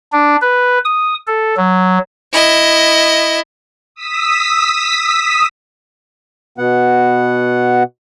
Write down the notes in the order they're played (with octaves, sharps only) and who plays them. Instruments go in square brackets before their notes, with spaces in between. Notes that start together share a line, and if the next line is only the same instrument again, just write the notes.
[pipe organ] D4
B4
D#6
A4
F#3
[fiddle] E4 D#5
[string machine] D#6 E6 B6
[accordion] B2 B3 F#5